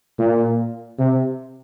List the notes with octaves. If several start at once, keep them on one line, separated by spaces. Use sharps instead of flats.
A#2
C3